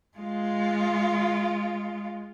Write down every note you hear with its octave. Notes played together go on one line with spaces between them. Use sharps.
G#3 F4